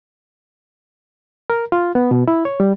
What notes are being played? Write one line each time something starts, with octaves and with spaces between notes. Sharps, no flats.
A#4
F4
B3
B2
E4
C#5
G3